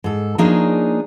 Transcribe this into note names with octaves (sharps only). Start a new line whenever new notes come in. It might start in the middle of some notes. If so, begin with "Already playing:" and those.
G#2 A4
F3 A#3 D4 D#4 G#4 C#5